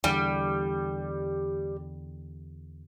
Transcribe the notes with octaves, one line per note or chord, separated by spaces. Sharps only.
E2 D3 G3